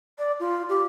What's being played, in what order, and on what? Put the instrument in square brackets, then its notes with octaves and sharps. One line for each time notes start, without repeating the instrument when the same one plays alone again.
[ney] D5
F4
G4